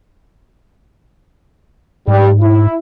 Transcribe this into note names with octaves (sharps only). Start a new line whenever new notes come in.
G#2 G3
E4